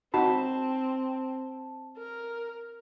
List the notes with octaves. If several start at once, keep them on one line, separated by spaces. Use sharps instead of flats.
C4 D#4 F#4 A5 B5
A#4